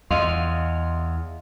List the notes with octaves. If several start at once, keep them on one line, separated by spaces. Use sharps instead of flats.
E2 D#5 F5 C6